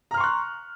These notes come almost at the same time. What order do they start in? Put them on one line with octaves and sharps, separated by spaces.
A#5 F6 C6 C#6 F#6